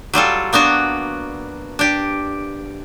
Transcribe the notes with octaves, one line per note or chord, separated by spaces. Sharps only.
F#3 G3 F4 A4
A#3 B3 D4 F#4
D4 G4